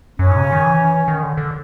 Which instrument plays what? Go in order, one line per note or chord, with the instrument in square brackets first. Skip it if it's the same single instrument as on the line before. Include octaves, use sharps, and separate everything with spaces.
[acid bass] F#2 [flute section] C#4
[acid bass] G#2
C3
C#3
D#3
E3
D#3
D3
D3